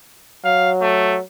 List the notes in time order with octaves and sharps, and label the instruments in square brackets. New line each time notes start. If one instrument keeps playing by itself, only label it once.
[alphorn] F#3 [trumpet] F5
[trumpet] A3